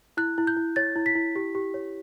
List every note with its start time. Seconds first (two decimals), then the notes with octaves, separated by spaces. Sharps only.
0.17 E4 F#6
0.38 E4
0.47 G6
0.57 E4
0.76 C#5 A6
0.96 E4
1.06 B6
1.15 E4
1.36 G4
1.55 G4
1.74 C#5